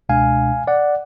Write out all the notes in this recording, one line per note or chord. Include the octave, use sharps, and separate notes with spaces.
C#2 B2 G#3 D4 F5 G#5
D5 F#5